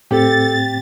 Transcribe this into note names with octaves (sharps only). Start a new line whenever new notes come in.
A2 C4 G4 A4 A6